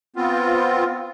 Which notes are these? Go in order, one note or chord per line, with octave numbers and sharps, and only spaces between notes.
B3 C4 F4